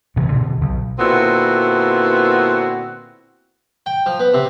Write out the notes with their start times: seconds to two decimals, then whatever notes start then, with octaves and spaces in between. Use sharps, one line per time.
0.16 A1 G2 C3 E3
0.32 B2 D3
0.61 B1
0.99 A#2 D3 B3 C4 E4 F#4
3.86 G5
4.06 F3
4.20 B3
4.34 C3